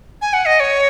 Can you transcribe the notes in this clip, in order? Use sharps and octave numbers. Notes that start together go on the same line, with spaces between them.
G#5
F#5
D#5
C#5